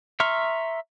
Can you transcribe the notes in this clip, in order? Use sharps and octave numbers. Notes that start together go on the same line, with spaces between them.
E5 A#5 C6 C#6 F6